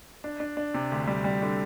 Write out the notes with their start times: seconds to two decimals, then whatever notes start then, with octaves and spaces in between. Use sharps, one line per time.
0.24 D4
0.40 D4
0.57 D4
0.74 C3
0.92 D2
1.07 G3
1.24 G3
1.42 D3